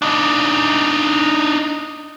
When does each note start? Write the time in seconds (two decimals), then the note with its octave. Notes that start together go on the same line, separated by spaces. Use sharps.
0.02 D4 D#4